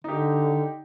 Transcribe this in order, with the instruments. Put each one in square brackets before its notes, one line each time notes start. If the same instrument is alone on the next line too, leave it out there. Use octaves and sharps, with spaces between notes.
[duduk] D3 [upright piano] D#4 G4